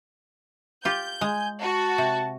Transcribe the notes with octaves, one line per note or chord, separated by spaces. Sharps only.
F4 G4 G6
G#3 G#5
F#4 A5
C3